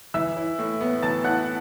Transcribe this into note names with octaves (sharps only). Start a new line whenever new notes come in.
E3 E5 E6
E4
A2
B3
E3 A5 A6
E4 F#5 F#6